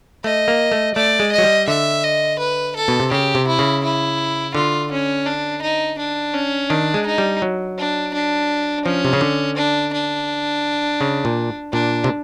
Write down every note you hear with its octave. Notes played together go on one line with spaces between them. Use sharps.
A3 D#5
A#3
A3
A3 D5
G#3
D#5
F#3
G3
D3 E5
D#5
B4
A4
B2
C3
C#3 G4
C3
E4
C#3
E4
D3 F4
C#4
D4
D#4
D4
C#4
D#3 D4
G#3
D#4
G3
F#3
D4
D4
F3 C#4
C3
C#3
D3
D4
D4
C#3
A#2
A#2 D4
C3